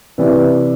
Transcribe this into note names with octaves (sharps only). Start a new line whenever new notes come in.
C3 E3 B4 D5